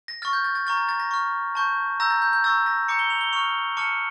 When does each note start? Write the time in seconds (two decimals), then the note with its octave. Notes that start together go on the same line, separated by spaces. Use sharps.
0.08 A#6
0.22 C#6 F6 A6
0.33 G6
0.44 A6
0.55 A6
0.66 A#5 C#6 F6 A6
0.77 A6
0.89 A6
1.00 A#6
1.11 C#6 F6
1.55 A5 C#6 G6
2.00 A#5 E6 G6 A#6
2.10 A6
2.22 G6
2.33 G6
2.44 A#5 C#6 E6 A6
2.66 A#6
2.88 A#5 D6 G6 C#7
2.99 G7
3.10 F7
3.21 G7
3.33 C#6 F6 F7
3.77 A5 D6 F6 C#7